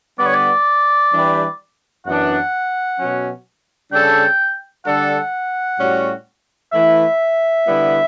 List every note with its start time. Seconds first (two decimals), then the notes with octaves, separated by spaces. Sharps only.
0.18 D3 G3 B3 D5
0.26 C#5
0.34 D5
1.12 E3 G3 D4 G4 B4
2.06 F#2 E3 B3 D4 F#5
2.99 B2 F#3 C#4
3.92 C#3 G3 D4 A4 G5
4.86 D3 G3 D4 A4 F#5
5.79 A2 G3 C#4 F#4
6.72 E3 A3 E4 B4 E5
7.67 D3 G3 B3 E4